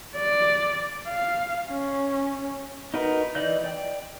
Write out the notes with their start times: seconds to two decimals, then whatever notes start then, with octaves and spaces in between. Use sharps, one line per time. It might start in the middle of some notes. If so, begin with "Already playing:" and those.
0.16 D5
1.08 F5
1.68 C#4
2.94 D#4 F#4 A#4 B4
3.35 E3 D5 D#5 G6
3.64 D5 G5